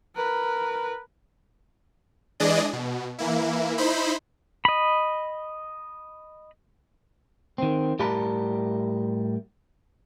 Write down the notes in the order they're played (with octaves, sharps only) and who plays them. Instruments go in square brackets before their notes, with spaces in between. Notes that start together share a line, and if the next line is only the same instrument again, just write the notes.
[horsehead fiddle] A#4 B4
[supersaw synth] E3 G#3 D4 G#4 D5 D#5
B2
E3 A#3 E4
D#4 E4 C5 B5
[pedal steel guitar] D#5 B5
[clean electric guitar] D#3 C4
A2 G3 G4 A#4 A5 B5